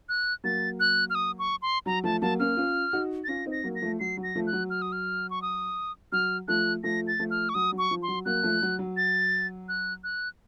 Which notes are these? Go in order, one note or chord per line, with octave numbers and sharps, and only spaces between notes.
F#6
F#3 A#3 A6
F#6
F6
D#6
C#6
C6
F#3 A#5
F3 A3 A5
F#3 A#3 A5
A#3 C#4 F6
C#4 F4
D#4 F#4
A6
C#4 F4 A#6
C4 D#4
A#6
F#3 A#3
A#6
F3 A3
F#3 C7
F#3
A#6
F3 A3
F#6
F#3
F6
D#6
F6
C#6
D#6
F#3 F6
F3 A3 F#6
F3 A3 A#6
A6
F3 A3
F6
C#6
F#3 D#6
F#3
C#6
F3
C6
F#3
F#3 A#3 F#6
F3 A3
F#3
F#3
A6
F#6
F#6